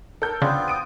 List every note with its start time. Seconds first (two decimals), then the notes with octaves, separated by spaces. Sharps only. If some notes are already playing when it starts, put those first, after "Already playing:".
0.22 A4 A#4 G6
0.42 C#3 B3 C4 D4 F4
0.68 D#6 D7 D#7